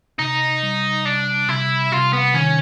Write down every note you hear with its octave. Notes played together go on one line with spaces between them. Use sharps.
C3 D#4
G3
C3 D4
C3 E4
C3 F4
B3
D#3 C#4